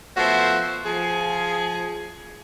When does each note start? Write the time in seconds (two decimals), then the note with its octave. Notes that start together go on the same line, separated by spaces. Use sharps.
0.17 F3 A3 B3 F#4 C5 E5
0.85 F3 G#4